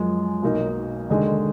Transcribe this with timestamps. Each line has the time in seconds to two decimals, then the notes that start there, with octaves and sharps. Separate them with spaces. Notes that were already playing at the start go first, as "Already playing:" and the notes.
Already playing: F#2 F3 G#3
0.42 B1 B2 F#3 A#3 D#4
1.09 D#2 D3 G#3 D#4 G#4